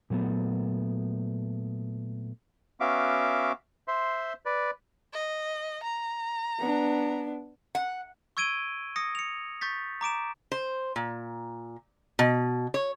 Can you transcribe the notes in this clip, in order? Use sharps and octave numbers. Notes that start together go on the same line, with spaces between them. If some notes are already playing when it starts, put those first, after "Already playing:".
A#2 F#3 A3 B3
B3 C#4 F#4 E5 F5 D6
C5 E5 C6
B4 D5
D#5
A#5
B3 D4
F#5
C#6 E6 G#6 D7 D#7 G7
D#6 A#6 C#7
C#7 F7
C#6 G6 A6 B6
A#5 D6 D7 E7
C5
A#2
B2
C#5